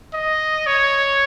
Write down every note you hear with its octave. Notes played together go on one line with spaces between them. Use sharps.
D#5
C#5